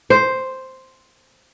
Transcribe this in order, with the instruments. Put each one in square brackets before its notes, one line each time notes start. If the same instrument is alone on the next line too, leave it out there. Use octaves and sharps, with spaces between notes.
[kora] C5